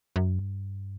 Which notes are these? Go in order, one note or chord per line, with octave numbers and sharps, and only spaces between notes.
F#2
G2